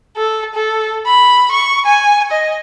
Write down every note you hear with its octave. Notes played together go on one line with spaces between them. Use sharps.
A4
A4
B5
C#6
G#5
D#5